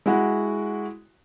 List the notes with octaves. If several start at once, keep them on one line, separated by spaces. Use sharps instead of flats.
G#3 E4 F#4 F#5